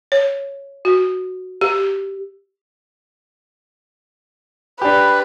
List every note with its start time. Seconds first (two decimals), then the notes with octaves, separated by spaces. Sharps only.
0.12 C#5
0.85 F#4
1.61 G4
4.82 D4 G4 B4